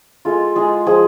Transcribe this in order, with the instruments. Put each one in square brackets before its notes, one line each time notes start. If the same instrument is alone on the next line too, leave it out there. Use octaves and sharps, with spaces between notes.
[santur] G#3 F4 A4
G#3 G#4
F3 G#4